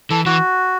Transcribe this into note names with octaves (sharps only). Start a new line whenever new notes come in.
E3 A4
E3 F#4